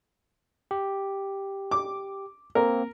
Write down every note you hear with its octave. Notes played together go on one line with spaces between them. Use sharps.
G4
D6
A#3 C4 A#4